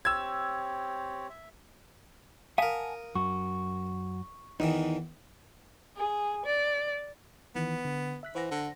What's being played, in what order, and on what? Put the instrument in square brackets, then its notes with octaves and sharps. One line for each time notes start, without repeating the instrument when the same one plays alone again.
[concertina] C4 G4 C#5 [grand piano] E6 G#6
[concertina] E5
[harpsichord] A#4 D#6 [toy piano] F5 [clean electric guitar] F#5 G#5 A5
[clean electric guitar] F#2 F#4 [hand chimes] C#6
[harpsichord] E2 D#3 E3 [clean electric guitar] D#4
[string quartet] G#4
D5
[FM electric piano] D#3 E3 [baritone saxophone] B3
[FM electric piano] D3
E5 F#6 B6
[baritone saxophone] E3 [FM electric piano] C5 F#5 A#6
[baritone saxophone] D3